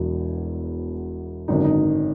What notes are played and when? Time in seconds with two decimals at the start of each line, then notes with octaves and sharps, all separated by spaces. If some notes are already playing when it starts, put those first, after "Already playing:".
Already playing: E1 E2 B2 F#3 E4
1.48 G#1 F#2 D3 D#4
1.56 D4
1.64 D#4